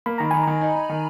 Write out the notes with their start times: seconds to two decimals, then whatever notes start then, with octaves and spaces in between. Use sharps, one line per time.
0.06 A#3 B5
0.18 D#3 A#5
0.31 D#3 G#5
0.43 D#3 A#5
0.61 D#4
0.75 D#4
0.89 D#3